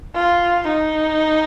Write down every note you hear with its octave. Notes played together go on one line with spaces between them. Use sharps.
F4
D#4